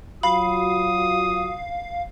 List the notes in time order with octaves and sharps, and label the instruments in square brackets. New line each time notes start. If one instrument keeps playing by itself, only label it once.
[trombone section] F#3 F4 F#4 [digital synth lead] F5 [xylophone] B5 [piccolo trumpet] D#6